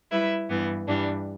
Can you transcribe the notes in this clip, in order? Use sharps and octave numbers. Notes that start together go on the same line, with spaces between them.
G3 E4 B4 E5
G2 E3 B3
G2 E3 G3 D4